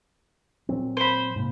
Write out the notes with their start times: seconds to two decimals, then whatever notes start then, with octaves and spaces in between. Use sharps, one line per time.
0.69 A#2 F#3 C4
0.97 C5 B5
1.36 G#2 C3 A#3